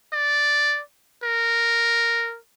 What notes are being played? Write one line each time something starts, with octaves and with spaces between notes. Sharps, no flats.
D5
A#4